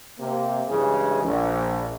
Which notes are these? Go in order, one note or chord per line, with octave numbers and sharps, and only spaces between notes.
C3 A#3
G2 C#3 E3 G#3 G#4
A#1